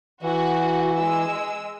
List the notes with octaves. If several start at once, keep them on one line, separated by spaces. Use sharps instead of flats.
E3 F#4
G#3 E6